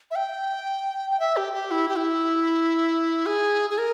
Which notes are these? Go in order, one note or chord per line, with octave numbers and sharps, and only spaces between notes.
E5
G5
G5
E5
G4
G4
E4
G4
E4
G#4
G#4
A#4